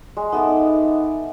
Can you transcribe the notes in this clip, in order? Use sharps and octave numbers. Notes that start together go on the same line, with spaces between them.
G#3
B3 D#4 A4 D#5 E5 D6